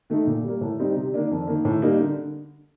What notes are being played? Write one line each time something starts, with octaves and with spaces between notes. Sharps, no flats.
D#3 A3 D#4
A#2
G3 A#3
A2
G3 C4 D#4
C3
D#3 A#3 D4
F2
D#3 A#3
A2
G3 A#3 D#4
D3